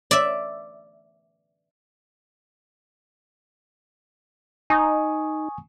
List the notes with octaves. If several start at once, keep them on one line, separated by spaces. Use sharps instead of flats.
D5 E5
D#4 G#5 C#6 D#6